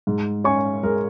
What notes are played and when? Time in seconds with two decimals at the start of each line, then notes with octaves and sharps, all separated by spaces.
0.07 G#2
0.44 C#4 G#5 C#6
0.83 G#3 A#4